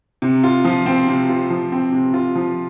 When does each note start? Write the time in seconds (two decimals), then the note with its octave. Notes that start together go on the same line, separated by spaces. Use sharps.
0.22 C3
0.44 F4
0.65 F3
0.86 C4
1.08 C3
1.29 F4
1.50 F3
1.72 C4
1.92 C3
2.14 F4
2.35 F3